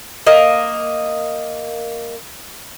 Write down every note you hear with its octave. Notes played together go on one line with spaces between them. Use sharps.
A#3 D#5